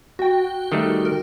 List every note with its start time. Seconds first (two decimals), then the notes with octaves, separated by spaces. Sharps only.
0.19 F#4 G5
0.72 D#3 G3 A3
1.05 A#4